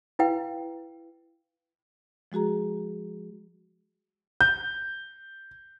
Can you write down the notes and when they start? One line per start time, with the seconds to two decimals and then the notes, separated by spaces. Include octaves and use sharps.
0.19 E4 B4 F5 G5
2.32 F3 G#3 F#4 G#4 A#5
4.41 G6